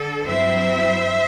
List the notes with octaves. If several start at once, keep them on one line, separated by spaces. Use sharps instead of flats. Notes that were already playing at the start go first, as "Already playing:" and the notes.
Already playing: D3 A4
G2 F#3 C4 E4 C5 E5